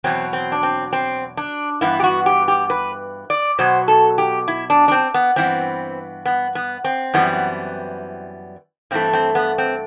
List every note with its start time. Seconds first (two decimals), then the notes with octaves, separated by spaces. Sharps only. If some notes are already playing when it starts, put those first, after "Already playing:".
0.04 E2 B2 F#3 C4
0.33 C4
0.52 D4
0.63 C4
0.93 C4
1.37 D4
1.81 G2 E3 B3 E4
2.00 G4
2.04 F#4
2.26 G4
2.48 G4
2.70 B4
3.30 D5
3.59 B2 F#3 B3 C5
3.88 A4
4.18 G4
4.48 E4
4.70 D4
4.88 D4
4.92 C4
5.14 B3
5.36 G2 E3 B3 C4
6.25 B3
6.55 B3
6.84 C4
7.14 F#2 E3 G3 B3
8.91 G2 E3 A3 C4
9.13 C4
9.35 B3
9.58 C4